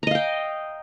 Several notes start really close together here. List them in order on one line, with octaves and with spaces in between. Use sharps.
A#5 D#5 F5 G5